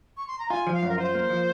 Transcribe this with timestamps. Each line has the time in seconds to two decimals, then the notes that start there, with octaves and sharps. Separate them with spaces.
0.17 C#6
0.27 C6
0.39 A#5
0.50 F4 G#5
0.67 F3
0.74 F5
0.83 F#2
0.89 A#4
0.98 F4 C5
1.15 A#3
1.30 F3